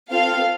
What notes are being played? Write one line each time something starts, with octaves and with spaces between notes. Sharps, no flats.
C4 F4 A4 F5